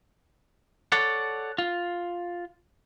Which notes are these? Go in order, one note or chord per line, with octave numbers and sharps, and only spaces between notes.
A4 C#5 D5 F#5
F4